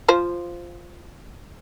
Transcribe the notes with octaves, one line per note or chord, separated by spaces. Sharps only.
F3 F4 C5